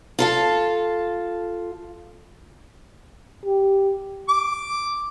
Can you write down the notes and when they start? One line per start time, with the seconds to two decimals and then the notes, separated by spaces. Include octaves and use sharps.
0.19 F4 A4 F5
3.45 G4
4.29 D6